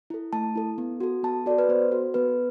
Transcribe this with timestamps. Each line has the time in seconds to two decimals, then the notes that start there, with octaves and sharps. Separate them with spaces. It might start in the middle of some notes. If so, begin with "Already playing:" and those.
0.10 E4 A4
0.33 A3 A5
0.55 E4 A4
0.78 B3
1.00 F#4 A4
1.23 B3 A5
1.46 F#4 D5
1.50 A4
1.58 B4
1.69 B3 C5
1.91 F#4 A4
2.14 B3 B4